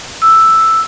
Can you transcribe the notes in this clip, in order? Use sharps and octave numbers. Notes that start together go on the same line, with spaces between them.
E6